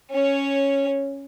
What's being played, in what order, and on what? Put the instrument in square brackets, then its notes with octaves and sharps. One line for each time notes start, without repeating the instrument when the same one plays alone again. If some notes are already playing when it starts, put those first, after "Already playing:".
[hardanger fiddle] C#4 C#5